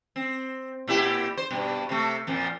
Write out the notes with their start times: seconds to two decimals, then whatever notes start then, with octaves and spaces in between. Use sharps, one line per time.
0.16 C4
0.87 A#2 E4 G4
1.37 C5
1.51 G2 B2
1.89 C3 A3
2.27 F2 A#2 F3